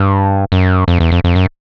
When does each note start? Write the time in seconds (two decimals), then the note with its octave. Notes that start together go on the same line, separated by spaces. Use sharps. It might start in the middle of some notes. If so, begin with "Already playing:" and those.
Already playing: G2
0.52 F#2
0.88 F2
1.00 E2
1.12 F2
1.24 F2
1.36 F#2